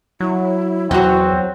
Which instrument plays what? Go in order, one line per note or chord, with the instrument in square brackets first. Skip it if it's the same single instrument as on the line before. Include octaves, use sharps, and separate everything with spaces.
[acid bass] F#3 [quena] E4
[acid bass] E2 [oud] F#3 F#4 [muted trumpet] C4